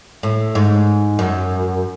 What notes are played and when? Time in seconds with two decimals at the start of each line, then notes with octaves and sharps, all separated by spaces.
0.23 A2
0.55 G#2
1.19 F#2